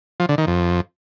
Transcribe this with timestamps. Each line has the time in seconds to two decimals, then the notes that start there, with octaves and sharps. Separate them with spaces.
0.20 F3
0.29 D3
0.38 D#3
0.47 F2